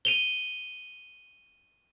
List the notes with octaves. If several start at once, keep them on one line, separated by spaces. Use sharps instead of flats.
D#7 F7 G7